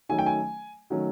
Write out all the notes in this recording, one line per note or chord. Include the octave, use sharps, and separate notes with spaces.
D#3 F#3 A3 C#4 G#5
G5
G#5
D#3 F#3 A3 C#4